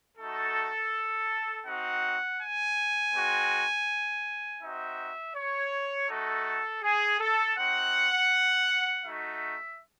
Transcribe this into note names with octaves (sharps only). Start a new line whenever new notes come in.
A3 D#4 F#4 A4
C4 D#4 F#4 F#5
G#5
G#3 C4 F#4
C4 D#4 F#4 E5
C#5
A3 D#4 F#4 A4
G#4
A4
C4 D#4 F#4 F#5
A3 D#4 F#4 E5